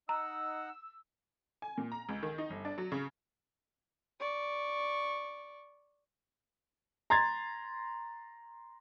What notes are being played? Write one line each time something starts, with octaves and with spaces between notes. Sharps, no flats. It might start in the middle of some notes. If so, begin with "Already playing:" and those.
D#4 F#5 A#5 E6
G#5
A#2
A#5
C#2
D#3
D#4
G1
D4
F#3
C#3
D5 C#6
A#5 C6 G#6 A6